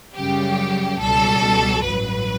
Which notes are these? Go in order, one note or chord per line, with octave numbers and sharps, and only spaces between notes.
F#2 C#3 G3 G4
C#2 B2 G3 A4
A1 G2 F#3 B4